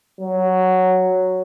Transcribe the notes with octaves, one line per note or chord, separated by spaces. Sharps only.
F#3